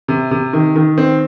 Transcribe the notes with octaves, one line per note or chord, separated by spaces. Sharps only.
C3
C3
D#3
D#3
C4